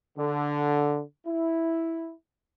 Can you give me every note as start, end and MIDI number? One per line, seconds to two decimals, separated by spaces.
0.17 1.01 50
1.26 2.12 64